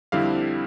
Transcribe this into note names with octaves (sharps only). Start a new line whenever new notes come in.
F2 D3 G3 C4 E4 F5